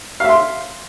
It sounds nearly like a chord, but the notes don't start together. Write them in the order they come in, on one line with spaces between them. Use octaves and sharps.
F5 E5 C6